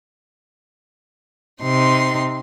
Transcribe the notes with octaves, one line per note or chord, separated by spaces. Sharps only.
C3 D#4 C6